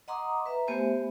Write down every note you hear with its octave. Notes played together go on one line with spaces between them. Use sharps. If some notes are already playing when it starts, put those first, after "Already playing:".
D#5 F#5 A#5 C6 D6 D#6
B4 E5 A#5
A3 B3 G4 C5 E5 G#5